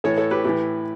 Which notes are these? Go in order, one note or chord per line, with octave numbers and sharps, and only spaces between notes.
A2 E3 A4 C#5
A4 C#5
G4 B4
A2 E3 G4 B4